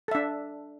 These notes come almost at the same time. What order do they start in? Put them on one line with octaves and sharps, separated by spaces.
A4 E5 D4